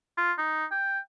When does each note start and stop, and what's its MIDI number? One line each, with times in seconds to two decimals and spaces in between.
0.18 0.33 65
0.38 0.66 63
0.71 0.99 79